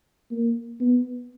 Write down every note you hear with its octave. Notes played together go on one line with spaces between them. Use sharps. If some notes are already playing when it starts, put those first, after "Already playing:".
A#3
B3